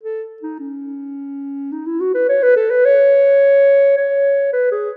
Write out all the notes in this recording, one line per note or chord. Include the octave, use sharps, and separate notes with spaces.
A4
D#4
C#4
D#4
E4
F#4
B4
C#5
B4
A4
B4
C#5
C#5
B4
G#4